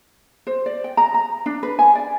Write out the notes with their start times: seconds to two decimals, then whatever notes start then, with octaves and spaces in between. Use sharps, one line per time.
0.47 C5
0.66 D5
0.84 G5
0.97 A#5
1.14 A#5
1.46 D4
1.63 B4
1.79 G#5
1.95 D5